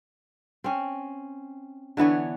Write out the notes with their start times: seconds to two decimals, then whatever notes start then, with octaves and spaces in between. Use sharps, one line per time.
0.64 C4 C#4
1.97 D3 E3 B3 C#5